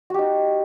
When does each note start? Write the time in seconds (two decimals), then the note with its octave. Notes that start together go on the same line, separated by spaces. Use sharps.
0.10 F#4
0.14 G4
0.19 D#4